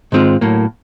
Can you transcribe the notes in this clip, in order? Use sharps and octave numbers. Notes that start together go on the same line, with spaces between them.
G#2 D#3 G#3 C4 F4
A2 F#3 A#3